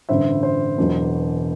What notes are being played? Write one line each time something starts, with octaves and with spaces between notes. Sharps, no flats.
A1 G2 D3 C5 E5
C5
E1 E2 B2 F#3